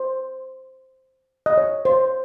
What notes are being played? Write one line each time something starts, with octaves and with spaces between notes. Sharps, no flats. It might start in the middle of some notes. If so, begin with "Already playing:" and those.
Already playing: C5
D#5
C#5
C5